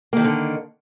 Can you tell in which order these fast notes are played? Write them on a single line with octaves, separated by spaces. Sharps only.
A#3 D#3 F3 D3